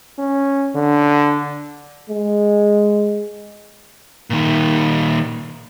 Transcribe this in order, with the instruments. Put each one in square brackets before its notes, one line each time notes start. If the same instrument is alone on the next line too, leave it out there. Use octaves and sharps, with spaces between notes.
[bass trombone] C#4
D3
[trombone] G#3
[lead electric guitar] A#2 D#3